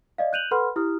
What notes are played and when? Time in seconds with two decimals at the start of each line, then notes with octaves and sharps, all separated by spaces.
0.18 D5 D#5 F5
0.33 F#6 G6 D#7 F7 F#7
0.51 A4 B4 F#5 B5 C6 F6
0.76 E4 G4 D#6 F6